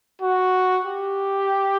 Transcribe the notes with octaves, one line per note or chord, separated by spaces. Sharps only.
F#4
G4